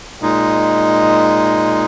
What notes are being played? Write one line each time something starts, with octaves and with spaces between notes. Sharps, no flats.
A#2 G#3 D#4